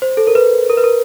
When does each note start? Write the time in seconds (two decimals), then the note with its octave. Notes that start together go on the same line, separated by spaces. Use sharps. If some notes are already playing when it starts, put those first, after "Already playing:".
0.02 C5
0.17 A4
0.27 A#4
0.35 B4
0.69 A#4
0.77 B4
0.84 A#4